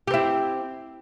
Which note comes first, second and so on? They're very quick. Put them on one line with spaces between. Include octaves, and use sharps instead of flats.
G4 C4 E4